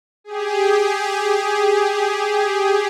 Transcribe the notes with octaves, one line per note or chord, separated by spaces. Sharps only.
G4 G#4